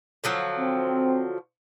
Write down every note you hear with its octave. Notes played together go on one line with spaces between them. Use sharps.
D3 F3 F#3
C4